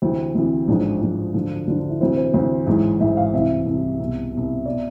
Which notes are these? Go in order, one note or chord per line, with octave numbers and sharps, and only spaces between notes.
D2 C3 E3 C4
D2 C3 E3
A1 G#2 F3 D4
A1 G#2 F3
D2 D3 F3
D2 D3 F3 D4
D4
E4
D2 C3 E3 C5
C5
D2 C3 E3 C5
A1 G#2 E3
A1 G#2 E3 E5
F5
C2 C3 E3 E5
C2 C3 E3
C2 B2
C2 B2
B2 D5